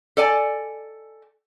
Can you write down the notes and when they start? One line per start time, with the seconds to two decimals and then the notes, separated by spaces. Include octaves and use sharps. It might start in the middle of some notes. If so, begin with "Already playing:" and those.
0.17 A4 D5 G#5